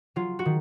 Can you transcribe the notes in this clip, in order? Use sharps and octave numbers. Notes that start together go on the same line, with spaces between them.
F#3 F4
F#4
D#3